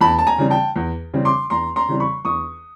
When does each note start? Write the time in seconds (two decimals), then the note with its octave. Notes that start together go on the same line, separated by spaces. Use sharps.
0.01 E2 A5 B5
0.19 A5
0.27 G#5 A#5
0.38 C#3 E3 G3 C4
0.50 G5 A5
0.76 E2
1.13 C#3 E3 G3 C4
1.25 C6 D6
1.50 E2 A#5 C6
1.76 A#5 C6
1.89 C#3 E3 G3 C4
2.00 B5 C#6
2.25 E2 C#6 D#6